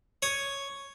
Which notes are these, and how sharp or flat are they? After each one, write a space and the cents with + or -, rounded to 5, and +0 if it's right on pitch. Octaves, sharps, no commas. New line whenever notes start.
C#5 +0 D#6 +5